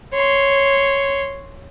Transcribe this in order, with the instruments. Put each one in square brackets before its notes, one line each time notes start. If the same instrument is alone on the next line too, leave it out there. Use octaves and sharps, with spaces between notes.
[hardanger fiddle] C#5 C6